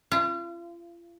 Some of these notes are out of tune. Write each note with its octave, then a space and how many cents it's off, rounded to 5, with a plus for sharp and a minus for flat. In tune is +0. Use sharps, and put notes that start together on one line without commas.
F4 -40